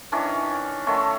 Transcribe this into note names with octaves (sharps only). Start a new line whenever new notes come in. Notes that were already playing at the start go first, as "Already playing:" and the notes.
D#3 E3 C#4 D4
D#3 F3 A3 C#4